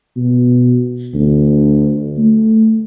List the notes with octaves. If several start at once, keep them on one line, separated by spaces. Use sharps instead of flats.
B2
D2
A3